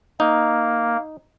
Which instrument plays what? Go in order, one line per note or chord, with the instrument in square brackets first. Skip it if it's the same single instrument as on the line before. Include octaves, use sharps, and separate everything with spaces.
[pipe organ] A#3 [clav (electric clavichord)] D#4